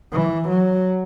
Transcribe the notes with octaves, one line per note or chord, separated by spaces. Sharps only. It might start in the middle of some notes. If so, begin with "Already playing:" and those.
E3
F#3